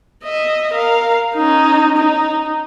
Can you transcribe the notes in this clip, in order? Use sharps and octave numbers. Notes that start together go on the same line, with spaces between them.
D#5 E5
A#4 F5
C#4 D#4
D#4